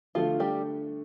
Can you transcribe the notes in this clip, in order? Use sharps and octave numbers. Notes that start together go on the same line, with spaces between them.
D3 F3 A3 D4 F4 A4
G3 G4